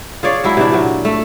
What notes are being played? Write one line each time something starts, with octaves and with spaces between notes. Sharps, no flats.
F4 G#4 C#5 D5
F#3 G#3 E4
C3 E3 D4
A#2 F#3
A3